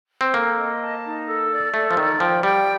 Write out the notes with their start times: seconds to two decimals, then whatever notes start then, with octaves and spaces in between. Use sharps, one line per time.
0.21 C4
0.34 A#3 A4
0.58 D#5
0.81 A5
1.05 D#4
1.27 A4
1.51 D5
1.74 A3 A4
1.91 F3
1.97 D#3 D5
2.20 F3 G5
2.43 G3 G5